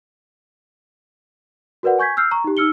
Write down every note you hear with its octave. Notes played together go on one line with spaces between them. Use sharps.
F#4 A#4 B4 D5 F#5
G#5 C#6 G6 G#6 B6
E6 F6 G6 C7
A#5 C#6
D#4 G4
D#4 E6 F6 C#7 G7